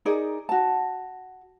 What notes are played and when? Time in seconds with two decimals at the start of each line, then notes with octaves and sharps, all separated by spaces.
0.05 D#4 G#4 A#4 D5
0.49 F#4 A5